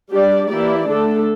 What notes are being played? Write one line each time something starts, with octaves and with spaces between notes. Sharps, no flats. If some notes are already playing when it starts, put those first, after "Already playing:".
G3 D4 G4 D5
E3 A#3 E4 G4 D5
D3 A3 D4 A4